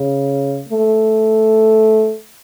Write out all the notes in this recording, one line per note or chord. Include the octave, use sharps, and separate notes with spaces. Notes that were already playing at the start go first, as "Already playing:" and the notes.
Already playing: C#3
A3